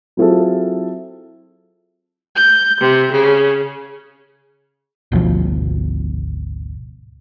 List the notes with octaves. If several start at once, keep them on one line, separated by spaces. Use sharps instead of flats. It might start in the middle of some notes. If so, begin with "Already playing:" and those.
F#3 C4 E4 F4 G#4 A4
G6
C3
C#3
G#1 D2 B2 F3